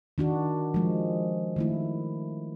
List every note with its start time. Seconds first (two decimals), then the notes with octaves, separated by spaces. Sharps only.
0.18 D#3 D4 F#4
0.74 F3 G#3
1.56 D#3 A3 E4